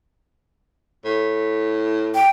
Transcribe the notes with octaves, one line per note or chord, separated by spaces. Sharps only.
A2
G5